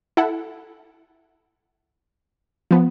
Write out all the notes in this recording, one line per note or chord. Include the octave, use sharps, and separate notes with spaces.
E4 A4 F#5
F3 B3